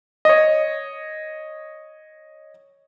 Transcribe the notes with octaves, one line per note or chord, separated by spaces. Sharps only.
C#5 D#5